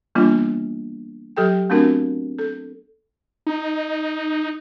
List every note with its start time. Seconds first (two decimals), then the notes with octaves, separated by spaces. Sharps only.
0.15 E3 G3 A#3 B3 D4 F4
1.37 F#3 G4 A4 G5
1.70 A3 B3 C4 D4 F#4 A#4
2.39 A4
3.47 D#4